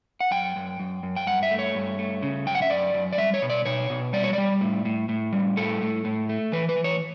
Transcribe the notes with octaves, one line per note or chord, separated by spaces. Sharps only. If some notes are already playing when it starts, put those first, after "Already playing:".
F#5
F#2 G5
F#2
F#2
F#2
G5
G2 F#5
E5
A3
C#5
G2
A3
C#3
F#2 G5
F#5
E5
F#2 D5
F#2
D5
G3 E5
C#5
B2
D5
B2 C#5
B2
G3 D5
C#5
G3 D5
A2
A2
A2
G3
A2 A4
A2
A2
A3
E3 B4
B4
E3
C#5